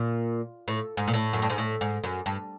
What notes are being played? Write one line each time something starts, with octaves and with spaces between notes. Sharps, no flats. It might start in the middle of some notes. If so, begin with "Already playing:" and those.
Already playing: A#2
A2
G#2
A#2
A2
F#2
G2
G#2
A2
G#2
F#2
G2